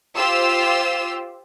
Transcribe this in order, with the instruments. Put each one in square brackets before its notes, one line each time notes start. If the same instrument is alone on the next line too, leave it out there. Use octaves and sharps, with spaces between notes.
[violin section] F4 G4 C5 E6